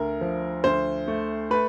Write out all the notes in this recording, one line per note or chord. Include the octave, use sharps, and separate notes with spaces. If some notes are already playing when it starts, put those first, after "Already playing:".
Already playing: D2 A#4
F3
D2 C5
A3
A3 B4